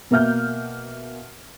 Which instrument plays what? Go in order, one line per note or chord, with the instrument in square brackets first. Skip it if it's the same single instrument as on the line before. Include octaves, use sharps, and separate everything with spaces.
[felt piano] B2 A#3 E5 F6 G6